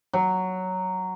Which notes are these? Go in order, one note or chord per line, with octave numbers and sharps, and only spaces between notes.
F#3